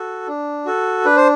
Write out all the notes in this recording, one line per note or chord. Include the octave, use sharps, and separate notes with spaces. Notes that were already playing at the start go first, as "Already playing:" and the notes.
Already playing: F#4 A4
D4
F#4 A4
D4 B4
C5